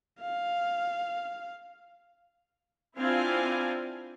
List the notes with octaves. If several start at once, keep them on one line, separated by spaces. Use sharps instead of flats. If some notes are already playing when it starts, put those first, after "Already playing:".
F5
C4 D4 E4 F4 F5 G#5